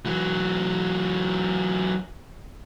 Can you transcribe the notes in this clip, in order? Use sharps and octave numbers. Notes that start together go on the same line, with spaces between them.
E3 F#3